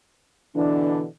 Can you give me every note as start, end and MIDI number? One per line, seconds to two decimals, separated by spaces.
0.54 1.06 47
0.54 1.06 50
0.54 1.06 52
0.54 1.01 62